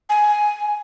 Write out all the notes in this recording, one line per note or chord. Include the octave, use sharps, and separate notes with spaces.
G#5